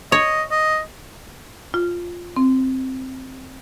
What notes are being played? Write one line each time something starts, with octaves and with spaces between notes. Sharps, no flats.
C#5 D#5
D#5
F4
C4